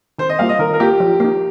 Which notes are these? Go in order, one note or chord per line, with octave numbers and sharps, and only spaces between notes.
D#3 C5
D#5
G3 A#3 F4 F5
D#5
D#3 A#4
A#4
A#3 F4 G4
F3
A#3 D#4